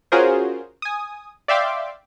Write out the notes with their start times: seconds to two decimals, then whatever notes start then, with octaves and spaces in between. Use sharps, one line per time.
0.12 C#4 F4 F#4 G#4 A#4 C5
0.82 G#5 D#6
1.48 D5 E5 F5 G5 C6 D6